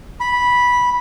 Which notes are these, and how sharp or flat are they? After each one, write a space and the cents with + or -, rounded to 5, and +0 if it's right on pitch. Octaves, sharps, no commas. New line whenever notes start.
B5 -10